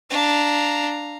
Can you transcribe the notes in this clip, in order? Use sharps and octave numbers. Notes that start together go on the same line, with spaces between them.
D4 F5 A#5